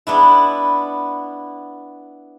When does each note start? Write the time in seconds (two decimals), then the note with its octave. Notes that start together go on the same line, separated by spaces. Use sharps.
0.07 B3 D4 E4